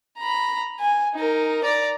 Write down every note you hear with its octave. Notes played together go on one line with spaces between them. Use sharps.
A#5 B5
G#5
D#4 A#4
D5 A#5